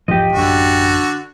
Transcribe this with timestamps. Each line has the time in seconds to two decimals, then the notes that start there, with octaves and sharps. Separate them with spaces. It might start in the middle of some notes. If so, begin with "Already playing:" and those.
0.08 E1 G#2 F3 G4 D#5
0.32 A1 F#2 D3 F#4